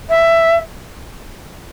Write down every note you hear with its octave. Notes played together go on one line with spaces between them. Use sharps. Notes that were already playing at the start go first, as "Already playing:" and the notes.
E5